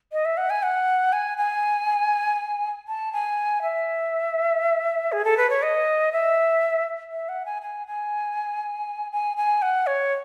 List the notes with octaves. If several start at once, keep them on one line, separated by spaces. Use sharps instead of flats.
D#5
E5
F#5
G#5
F#5
G#5
G#5
A5
G#5
E5
G#4
A4
B4
C#5
D#5
E5
E5
F#5
G#5
G#5
G#5
G#5
G#5
F#5
C#5